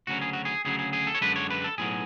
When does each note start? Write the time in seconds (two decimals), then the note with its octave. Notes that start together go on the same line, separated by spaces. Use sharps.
0.07 D2 C#3 F#3 C#4 F#4
0.22 G#4
0.33 F#4
0.45 G#4
0.65 D2 C#3 F#3 G#4
0.79 G#4
0.93 G#4
1.07 A4
1.15 C#5
1.21 F#2 D3 G#3 D4 B4
1.36 C#5
1.50 B4
1.64 A4
1.78 B1 A2 F#3 G#4